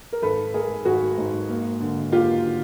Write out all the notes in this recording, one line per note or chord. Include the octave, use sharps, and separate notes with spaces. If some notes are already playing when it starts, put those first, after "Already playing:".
A#4
G#1 A4 B4
G#3 G#4 A#4
G#1 F#4 G#4
G#2
A#3
D3
A#3 F4 G4
D3